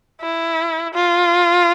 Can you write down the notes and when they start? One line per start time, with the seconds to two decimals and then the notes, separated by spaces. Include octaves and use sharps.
0.22 E4
0.94 F4